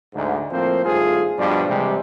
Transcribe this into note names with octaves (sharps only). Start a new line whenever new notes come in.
D2 G#2
A2 F3 A#3 C4 C5
G#1 G2 A3 F4 G#4
G2 B2 F3 G3
C3 E3 G3 G#3